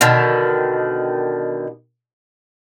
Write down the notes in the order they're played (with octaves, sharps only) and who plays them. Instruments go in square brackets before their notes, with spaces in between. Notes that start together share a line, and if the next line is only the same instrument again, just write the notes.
[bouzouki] B2 D3 D#3